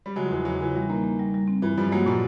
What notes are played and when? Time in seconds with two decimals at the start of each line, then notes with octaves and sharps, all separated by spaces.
0.06 G3
0.16 C#3 F#3 G#3
0.26 F3
0.31 E2 E3
0.45 C#3 E3 F#3
0.61 C#3 E3
0.75 E3 G3
0.89 D#3 A#3
1.04 A#3
1.19 G3
1.34 G3
1.48 C4
1.62 G2 E3
1.78 G2 F3 G3
1.92 F#3 G#3 A#3
2.06 A#2 F3 G3